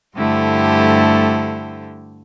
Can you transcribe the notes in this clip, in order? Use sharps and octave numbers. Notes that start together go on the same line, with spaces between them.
G2 D3 A3 E4 G4 C5